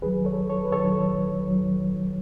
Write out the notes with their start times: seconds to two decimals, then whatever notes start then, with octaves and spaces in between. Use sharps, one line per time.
0.02 D#2 D#3 F#3 G#4 B4
0.25 A4 C#5
0.49 A4 C#5
0.64 B4
0.72 D#2 D#3 F#3 A4 C#5
1.44 D#2 D#3 F#3